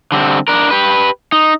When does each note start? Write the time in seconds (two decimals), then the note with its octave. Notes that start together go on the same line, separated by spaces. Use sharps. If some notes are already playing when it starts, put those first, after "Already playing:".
0.12 D3 G3 C4
0.48 D4 A#4
0.71 G4 B4
1.32 D#4